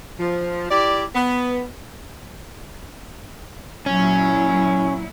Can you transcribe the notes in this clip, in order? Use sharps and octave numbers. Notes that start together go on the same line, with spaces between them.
F3
E4 G4 D5
B3
A#2 F#3 C#4 E4